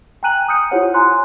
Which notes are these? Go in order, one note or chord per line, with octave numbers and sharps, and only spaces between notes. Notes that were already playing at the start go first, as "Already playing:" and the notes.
G5 G#5 A#5 F#6 D#7 F#7
D#6 F6 G6 C#7 D#7
E4 F4 G4 C5 C#5 F#5
G#5 A#5 C6 F#6